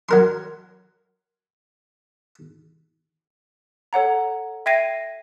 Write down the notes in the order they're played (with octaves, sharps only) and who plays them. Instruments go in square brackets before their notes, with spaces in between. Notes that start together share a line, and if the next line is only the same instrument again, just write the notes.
[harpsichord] F#3 A#4 C6
[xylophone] A4 C#5 F#5 A#5
E5 G5 G#6 A#6 C7 D#7